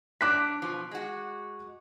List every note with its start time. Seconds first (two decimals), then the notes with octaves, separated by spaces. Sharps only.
0.21 G3 D4 D6 F#6 B6
0.62 B2 F3
0.91 G#3 F#4